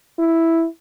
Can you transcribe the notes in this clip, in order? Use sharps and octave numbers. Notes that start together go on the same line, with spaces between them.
E4